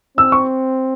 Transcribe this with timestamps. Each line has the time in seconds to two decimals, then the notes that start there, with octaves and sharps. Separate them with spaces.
0.17 C4 E6
0.32 C#6